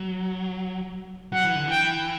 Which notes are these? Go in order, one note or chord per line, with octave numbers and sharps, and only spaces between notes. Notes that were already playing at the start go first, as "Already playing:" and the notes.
Already playing: F#3
F#3 F#5
E3
D3
E3 G5